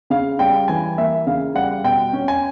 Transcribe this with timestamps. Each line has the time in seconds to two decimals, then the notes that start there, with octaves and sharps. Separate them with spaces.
0.10 C#3 F5
0.39 G3 G5
0.68 E3 G#5
0.98 A#3 E5
1.27 C#3 F5
1.55 G3 F#5
1.84 B2 G5
2.13 C#4
2.28 G#5